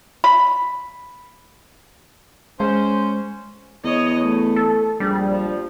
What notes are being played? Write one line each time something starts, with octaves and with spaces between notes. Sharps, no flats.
B5
G#3 C#4 C5
E2 C#5 D#5
A3
A4
A#1 G3 G#4
F3